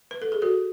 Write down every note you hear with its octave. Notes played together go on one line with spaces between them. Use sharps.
B4
A4
G#4
F#4 A4